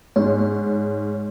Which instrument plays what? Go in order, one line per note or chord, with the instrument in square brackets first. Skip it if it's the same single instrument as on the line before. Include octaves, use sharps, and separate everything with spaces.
[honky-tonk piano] G#2 [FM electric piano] C#5